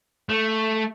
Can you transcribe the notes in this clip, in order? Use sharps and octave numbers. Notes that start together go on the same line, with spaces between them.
A3